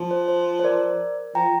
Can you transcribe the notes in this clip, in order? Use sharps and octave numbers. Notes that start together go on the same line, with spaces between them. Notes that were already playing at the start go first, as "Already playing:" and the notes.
Already playing: F3
C5
C5
C5
A#4 D5
F3 G5 A#5